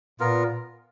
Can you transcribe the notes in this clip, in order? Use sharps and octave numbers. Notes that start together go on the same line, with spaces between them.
A#2 B3 F4 A#4